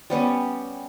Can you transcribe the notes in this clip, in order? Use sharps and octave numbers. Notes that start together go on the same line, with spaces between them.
G3 B3 C#4